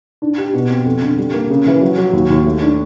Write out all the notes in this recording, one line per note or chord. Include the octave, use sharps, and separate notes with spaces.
D4
G4
B2
C4
F2
D3
G3
A#3
C#3
E3
F#3
F#3
D#2
D#2
A3
D4